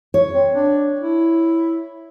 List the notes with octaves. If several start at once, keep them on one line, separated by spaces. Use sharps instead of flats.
C#5
C4
D4
E4